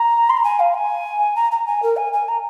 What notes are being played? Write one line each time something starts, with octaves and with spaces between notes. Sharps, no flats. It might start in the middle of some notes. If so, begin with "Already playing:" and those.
Already playing: A#5
C6
A#5
G#5
F5
G#5
A#5
A#5
G#5
A#4
G#5
G#5
A#5